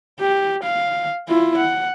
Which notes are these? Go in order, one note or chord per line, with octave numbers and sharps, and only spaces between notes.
G4
F5
E4 F4
F#5